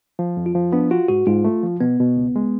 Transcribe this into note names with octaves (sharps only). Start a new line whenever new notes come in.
F3
F2
F4
F3
B3 D4
F4 F#4
G#2 F#4
G#2 F4
A3
F3
B2 B3
B2
C#2
G#3